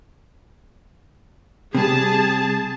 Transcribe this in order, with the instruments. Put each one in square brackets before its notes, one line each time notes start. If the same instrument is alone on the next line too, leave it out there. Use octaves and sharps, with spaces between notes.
[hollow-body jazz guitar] C3 G3 [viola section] G#4 A5